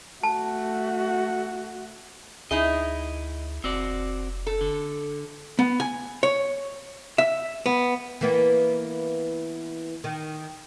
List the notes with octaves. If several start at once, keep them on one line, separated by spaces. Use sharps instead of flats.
A3 F#4 A5
D2 D#4 E4 G#4 D#5
F1 C4 F#4 D5
A4
D3
B3
G#5
C#5
E5
B3
E3 A#3 B3
D#3